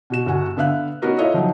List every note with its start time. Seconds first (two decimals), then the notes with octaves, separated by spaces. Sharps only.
0.10 B2 F#4 E7
0.26 G1 F#4 F#5 G#5
0.57 D3 B3 E5 F5 F#6
1.02 B3 C#4 D#4 F#4 A#4 B4
1.18 E4 F4 A4 C#5 D#5 E5
1.34 F3 F#3 D#4